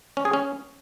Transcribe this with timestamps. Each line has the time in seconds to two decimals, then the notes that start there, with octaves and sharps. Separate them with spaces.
0.17 C#4
0.25 G#4
0.33 C#4